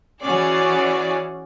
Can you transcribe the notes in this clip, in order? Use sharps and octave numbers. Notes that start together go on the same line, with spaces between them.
E3 C#4 F#4 G#4 D5